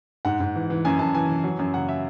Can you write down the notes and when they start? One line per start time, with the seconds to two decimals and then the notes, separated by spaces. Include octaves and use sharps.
0.25 G#2 F#5
0.40 G#2
0.55 E3
0.70 E3
0.85 F#2 G#5
0.99 F#2 A5
1.14 E3 G#5
1.29 E3
1.44 F#3
1.59 F#2
1.74 C#3 F#5
1.89 E5